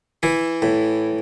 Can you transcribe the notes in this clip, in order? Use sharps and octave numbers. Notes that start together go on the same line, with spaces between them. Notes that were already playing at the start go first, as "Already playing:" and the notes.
E3 E4
A2